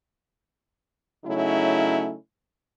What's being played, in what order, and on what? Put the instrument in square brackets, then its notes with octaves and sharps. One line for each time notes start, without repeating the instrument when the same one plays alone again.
[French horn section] C#3 F#3 A3 C#4 D#4 E4